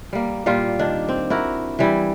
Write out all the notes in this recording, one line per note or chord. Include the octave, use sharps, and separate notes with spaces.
G3 A#3
A#2 G3 F4
D#3 D4
C4
E4 F#4 A#4
E3 G3 E4